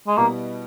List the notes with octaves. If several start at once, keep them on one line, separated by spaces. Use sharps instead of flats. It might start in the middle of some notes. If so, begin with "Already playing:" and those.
G#3
B2 G3 A#3 B3 E4